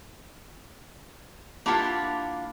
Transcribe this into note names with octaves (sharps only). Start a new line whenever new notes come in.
A#3 D4 E4 F4 G4 F#5